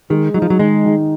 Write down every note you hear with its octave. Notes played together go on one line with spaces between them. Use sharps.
D#3 G#3
F#3 D#4
F3
F#3
D#3 G#3
D#3